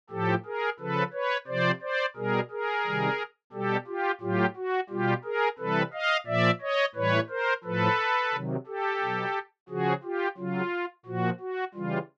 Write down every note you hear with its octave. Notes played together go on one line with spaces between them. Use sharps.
A2 F3 G4 A4
G#4 A#4
C#3 F3 A4 B4
B4 C#5
C3 F3 C5 D5
C5 D5
B2 G3 G#4 A#4
G#4 A#4
C3 D#3 G3
B2 G3 G4 A4
F4 G4
A2 F#3 F4 G4
F#4
B2 G3 F4 G4
G#4 A#4
C3 E3 G3 A4 B4
D#5 F5
A#2 F3 D5 E5
C#5 D#5
A2 E3 G3 B4 C#5
A#4 C5
A2 F3 A4 B4
C3 D#3 F#3
G4 A4
B2 F#3
C#3 F3 F#4 G#4
F4 G4
C#3 F#3 F4
A#2 F3 F#4
F#4
C#3 E3 G3 F4